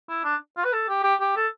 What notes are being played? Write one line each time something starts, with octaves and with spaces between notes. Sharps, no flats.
E4
D4
F4
B4
A4
G4
G4
G4
A4